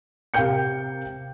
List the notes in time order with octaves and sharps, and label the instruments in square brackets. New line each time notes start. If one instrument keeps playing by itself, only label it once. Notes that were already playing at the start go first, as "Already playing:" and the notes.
[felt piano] C3 A#4 F5 G5 G6 C#7